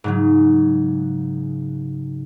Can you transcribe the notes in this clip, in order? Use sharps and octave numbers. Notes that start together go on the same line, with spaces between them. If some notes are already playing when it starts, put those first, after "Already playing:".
G#2 C#3 F#3